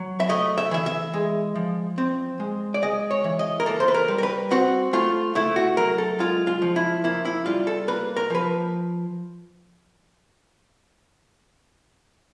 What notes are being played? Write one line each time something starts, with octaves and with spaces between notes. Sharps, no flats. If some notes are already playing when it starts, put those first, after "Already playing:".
Already playing: F#3
E5
A3 D#5
E5
E3 E5
E5
G#3
F3
C4
G#3
D5
G#3 D#5
C#5
E3
D#5
A#4
A#3 A4
C5
B4
A#4
G3
A#4
B4
C4 F#4
A3 F4
A3 E4
F#4
F#3 A#4
A4
G#3 F4
F4
F3
E4
A#3 E4
E4
G3 F4
A4
A#3 B4
A#4
F3 B4